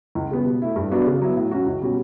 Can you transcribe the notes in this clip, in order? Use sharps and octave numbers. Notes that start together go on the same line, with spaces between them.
C#2
C#3 G3 B3
B2
A3 E4
G2
F#3 B3 D4 F#4
C#3
F#3 B3 E4
A2
F#3 C#4 F#4
C#2
B2 G3 C#4 F#4